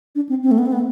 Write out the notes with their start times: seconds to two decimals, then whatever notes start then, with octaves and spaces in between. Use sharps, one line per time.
0.15 D4
0.29 C4
0.43 C4
0.51 A3
0.58 B3
0.66 C4
0.73 B3